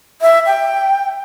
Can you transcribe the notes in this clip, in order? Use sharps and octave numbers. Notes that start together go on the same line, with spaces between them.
E5
G5